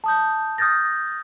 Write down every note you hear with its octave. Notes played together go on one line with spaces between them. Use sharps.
A5 D#6 G6
D#6 F6 G6 A6 A#6